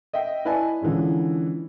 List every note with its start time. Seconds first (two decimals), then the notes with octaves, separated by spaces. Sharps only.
0.13 D#5 E5 G5
0.45 E4 B4 D5 D#5 G#5 A5
0.81 D3 E3 F3 G#3 C#4